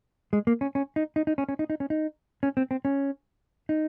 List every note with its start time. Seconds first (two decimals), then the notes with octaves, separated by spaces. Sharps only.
0.33 G#3
0.47 A#3
0.61 C#4
0.75 C#4
0.96 D#4
1.16 D#4
1.27 D#4
1.38 C#4
1.49 C#4
1.59 D#4
1.70 D#4
1.80 C#4
1.90 D#4
2.43 C#4
2.57 C4
2.71 C4
2.85 C#4
3.69 D#4